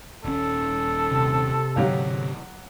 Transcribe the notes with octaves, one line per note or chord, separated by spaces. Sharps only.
D#1 C#4 A4
C3
G#2 B2 D3 F#3 G4 F5